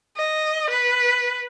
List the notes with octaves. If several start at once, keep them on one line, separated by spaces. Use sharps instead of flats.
D#5
B4